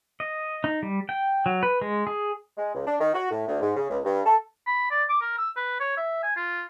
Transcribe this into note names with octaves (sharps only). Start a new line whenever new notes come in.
D#5
D#4
G3
G5
F#3
B4
G#3
G#4
G#3
C#2
D4
D#3
F#4
A2
D2
G#2
C#3
C#2
G2
A4
B5
D5
D6
A#4
E6
B4
C#5
E5
G#5
F4